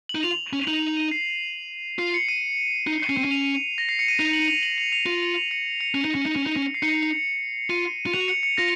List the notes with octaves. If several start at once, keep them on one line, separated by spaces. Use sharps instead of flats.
F#7
D#4
F4 F7
C#4
D#4 F#7
F7
D#7
C7
F4 C7
C#7
D#7
D#4
C7
C#4 C#7
C4
C#4 D#7
F7
A#6
C7
C#7
D#7
D#4 F7
F#7
F7
F#7
F7
F7
F4 F7
F7
F7
C#7
C#7
C#4
D#4
C#4
D#4
C#4
D#4
C#4
C7
D#4 C#7
F4 D#7
F4
F#4 F7
C#7
C#7
F4 A#6